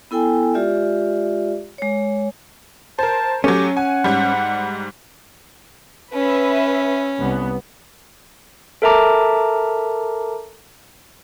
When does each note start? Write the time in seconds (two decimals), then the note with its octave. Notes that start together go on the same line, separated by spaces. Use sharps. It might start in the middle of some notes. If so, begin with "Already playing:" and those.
0.11 B3 E4 A4 G5 G#5
0.54 G#3 F4 G4 D5 E5
1.78 G#3 C#5
2.99 A#4 C5 A5
3.44 F#3 A3 C#4 G4
3.77 F#5 G#5
4.04 G#2 G3
6.13 C#4 B4 E5
7.19 C2 B3
8.82 A4 A#4 E5 A5 A#5 D6